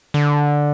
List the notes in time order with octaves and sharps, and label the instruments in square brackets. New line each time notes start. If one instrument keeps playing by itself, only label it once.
[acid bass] D3